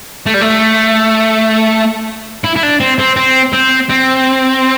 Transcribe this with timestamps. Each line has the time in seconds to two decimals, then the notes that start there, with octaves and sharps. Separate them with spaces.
0.27 A3
0.34 G3
0.41 A3
2.44 E4
2.56 E4
2.63 D4
2.80 C4
2.99 C4
3.16 C4
3.53 C4
3.90 C4